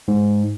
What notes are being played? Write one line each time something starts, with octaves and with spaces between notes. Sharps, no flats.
G#2